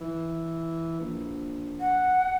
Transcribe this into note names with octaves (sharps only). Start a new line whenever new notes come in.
E3
A#1
F#5